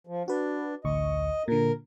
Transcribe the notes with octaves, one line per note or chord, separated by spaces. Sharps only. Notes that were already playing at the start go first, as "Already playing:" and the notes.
F3
D4 F#4 B4
A1 D2 D#5 C#6
A#2 D3 A#4